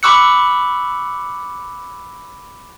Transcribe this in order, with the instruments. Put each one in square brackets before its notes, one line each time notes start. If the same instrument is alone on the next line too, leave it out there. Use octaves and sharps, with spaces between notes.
[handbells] B5 C#6 D6 E6 F#6 C#7